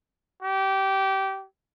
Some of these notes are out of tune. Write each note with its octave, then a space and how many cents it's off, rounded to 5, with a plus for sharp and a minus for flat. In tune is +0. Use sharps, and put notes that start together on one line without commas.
G4 -20